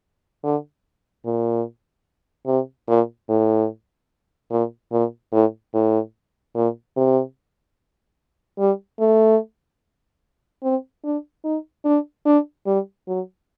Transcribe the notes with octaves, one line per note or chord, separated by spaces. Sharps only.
D3
A#2
C3
A#2
A2
A#2
A#2
A2
A2
A#2
C3
G3
A3
C4
D4
D#4
D4
D4
G3
F#3